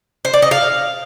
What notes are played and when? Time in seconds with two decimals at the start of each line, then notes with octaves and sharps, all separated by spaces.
0.25 C5
0.34 D5
0.42 D#5
0.51 F5